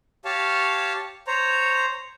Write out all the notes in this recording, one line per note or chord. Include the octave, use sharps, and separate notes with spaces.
G4 C#5 F5 A5
C5 C#5 A#5